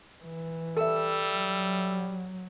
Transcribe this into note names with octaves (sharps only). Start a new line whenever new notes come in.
E3
G3 A4 E5 E6
F#3